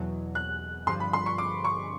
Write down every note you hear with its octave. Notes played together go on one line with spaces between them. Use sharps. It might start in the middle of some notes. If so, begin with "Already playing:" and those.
Already playing: E2 B2 F#3
F#6
G2 D3 F3 C6
B5
C6
C#6
D6
C#6